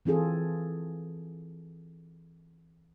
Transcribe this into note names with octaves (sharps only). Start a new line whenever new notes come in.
E3 C4 F4 G#4 A4